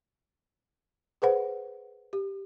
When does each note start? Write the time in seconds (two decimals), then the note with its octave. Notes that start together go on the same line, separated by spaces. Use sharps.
1.22 G#4 B4 C5 F#5
2.13 G4